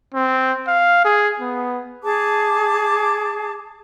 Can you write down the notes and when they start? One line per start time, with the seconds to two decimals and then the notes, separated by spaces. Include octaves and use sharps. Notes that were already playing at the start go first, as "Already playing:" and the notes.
0.14 C4
0.68 F5
1.05 G#4
1.40 B3
2.04 G#4 A5 D6